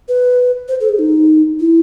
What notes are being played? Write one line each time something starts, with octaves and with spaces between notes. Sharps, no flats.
B4
C5
A4
G#4
D#4
E4